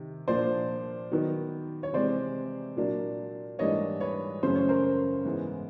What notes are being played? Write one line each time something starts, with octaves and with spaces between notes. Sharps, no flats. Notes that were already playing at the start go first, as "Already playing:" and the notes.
Already playing: C3 D#3
A#2 F3 A#3 D4 C5 D5
D#3 F#3 B3 D#4
C#5
C3 E3 G#3 C4 C5 D5
A#2 F#3 A#3 D4
G#2 E3 G3 A#3 D4 C#5 D#5
B4 C#5
F#2 C#3 E3 A3 C#4 C5
C#5
A#4 C5
G#2 E3 G#3 B3